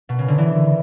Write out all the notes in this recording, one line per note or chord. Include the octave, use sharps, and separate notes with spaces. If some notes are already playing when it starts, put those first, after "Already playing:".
B2
C#3
D3
E3